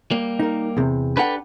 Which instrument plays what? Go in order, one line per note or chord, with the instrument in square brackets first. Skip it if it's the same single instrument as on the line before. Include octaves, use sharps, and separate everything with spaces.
[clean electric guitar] G3 A#3
[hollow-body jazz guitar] D#4 A#4
E2 C3
[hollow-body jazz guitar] D4 F#5 [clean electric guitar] G4 A4 B4